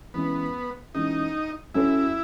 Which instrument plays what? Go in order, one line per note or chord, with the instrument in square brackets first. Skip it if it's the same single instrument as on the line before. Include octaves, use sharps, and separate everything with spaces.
[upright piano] E3 G#3 C#4 [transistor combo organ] B3
[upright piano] E3 G#3 C#4 [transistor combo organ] D#4
[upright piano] F#3 C#4 F#4 A4 [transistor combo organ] E4